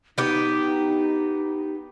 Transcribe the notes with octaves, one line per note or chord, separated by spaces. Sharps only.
B3 D#4 G4